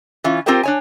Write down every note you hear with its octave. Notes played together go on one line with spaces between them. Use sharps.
E3 C#4 F4
C4 F4 G4 A#4 C5 G5
D4 C#5 G#5